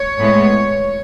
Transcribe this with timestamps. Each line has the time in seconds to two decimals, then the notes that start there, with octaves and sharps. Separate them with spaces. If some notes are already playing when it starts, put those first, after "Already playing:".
Already playing: C#5
0.18 A2 G#3 B3